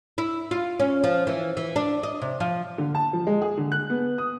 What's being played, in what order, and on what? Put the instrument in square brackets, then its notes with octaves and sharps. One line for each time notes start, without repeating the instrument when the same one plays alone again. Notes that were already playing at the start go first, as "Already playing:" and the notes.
[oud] E4
F4
C#4
F3
E3
E3
D4
D#5
C3
F3
[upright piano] D3
A5
F3
G#3
G#4
D3
F#6
B3
D#6